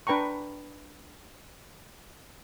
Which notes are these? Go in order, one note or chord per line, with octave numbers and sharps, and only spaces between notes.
D4 B4 G5 A#5 C#6